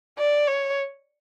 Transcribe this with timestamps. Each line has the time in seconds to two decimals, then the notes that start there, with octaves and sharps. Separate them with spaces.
0.19 D5
0.48 C#5